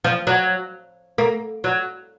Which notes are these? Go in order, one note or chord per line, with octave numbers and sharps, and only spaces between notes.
F3
F#3
A#3
F#3